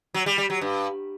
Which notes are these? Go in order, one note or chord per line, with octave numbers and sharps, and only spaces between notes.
F#3
G3
G3
F#3
G2